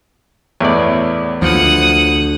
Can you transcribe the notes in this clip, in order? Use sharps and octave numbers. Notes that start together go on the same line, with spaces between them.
E2 A2 C#5 D5
D2 F3 F#5 D#6